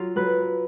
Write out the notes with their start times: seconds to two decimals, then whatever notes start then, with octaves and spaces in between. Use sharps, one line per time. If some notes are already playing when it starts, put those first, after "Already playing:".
Already playing: F#3 F4
0.16 F#3 B4